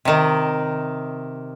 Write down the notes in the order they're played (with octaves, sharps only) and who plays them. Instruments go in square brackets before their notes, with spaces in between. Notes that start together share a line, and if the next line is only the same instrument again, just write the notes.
[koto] C3 D#3